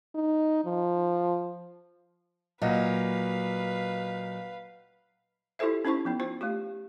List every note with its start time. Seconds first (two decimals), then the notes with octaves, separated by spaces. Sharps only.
0.15 D#4
0.65 F3
2.62 A#2 F#3 B4 D#5 F5
5.59 E4 F4 G4 A4 C5 E5
5.85 C#4 D#4 E4 C5 C#6
6.05 F3 B3 D#4
6.20 F4 C5
6.41 A3 F4 G4